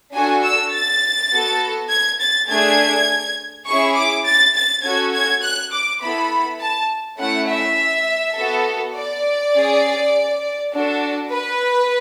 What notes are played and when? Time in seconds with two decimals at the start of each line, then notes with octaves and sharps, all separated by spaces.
0.14 D4 F#4 A4 G#5
0.44 E6
0.73 A6
1.32 B3 F#4 A4
1.90 G#6
2.20 A6
2.49 A3 D4 G#4 G#6
3.66 C#4 E4 G#4 C#6
3.95 D6
4.25 A6
4.55 A6
4.83 C#4 F#4 A4 G#6
5.13 G#6
5.43 F#6
5.72 D6
6.01 B3 E4 A4 B5
6.60 A5
7.19 A3 C#4 E4 F#5
7.48 E5
8.36 B3 F#4 A4
8.95 D5
9.54 C#4 G#4
10.72 D4 F#4 A4
11.30 B4